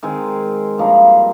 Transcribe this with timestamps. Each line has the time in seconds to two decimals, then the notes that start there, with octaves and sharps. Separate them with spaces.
0.03 D#3 G#3 C4
0.78 G2 F3 A#3 D#4